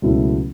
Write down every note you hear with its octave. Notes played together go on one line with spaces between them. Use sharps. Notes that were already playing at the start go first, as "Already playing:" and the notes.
C#2 B2 F#3 A3 E4